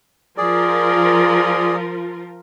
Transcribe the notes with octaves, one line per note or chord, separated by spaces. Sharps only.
F3 F4 G#4 A#4 D5